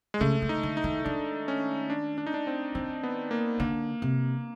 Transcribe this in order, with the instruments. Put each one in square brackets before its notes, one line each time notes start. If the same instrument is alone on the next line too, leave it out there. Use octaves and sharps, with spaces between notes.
[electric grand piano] G#3
[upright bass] C#3 [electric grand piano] A3
[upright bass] D3
[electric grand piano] D#4
[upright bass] D3
[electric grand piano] D#4
[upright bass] D#3
[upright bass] D#3 [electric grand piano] D4
[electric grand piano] C#4
D4
D4
D#4
D4
C4
[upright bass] D#3 [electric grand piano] C4
[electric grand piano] B3
A#3
[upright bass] D3 [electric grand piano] A#3
[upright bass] C3